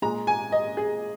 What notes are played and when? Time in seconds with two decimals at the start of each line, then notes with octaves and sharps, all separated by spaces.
0.02 A#2 G#3 A#5
0.27 G#5
0.52 D#5
0.77 G#4